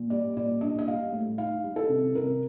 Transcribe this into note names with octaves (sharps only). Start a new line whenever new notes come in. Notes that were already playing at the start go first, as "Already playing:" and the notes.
Already playing: A#2
G3 D5
A#2 D5
D4 D#5
D#5
G3 F5
A2
D#4 F5
G3
A4
C3
C3 A#4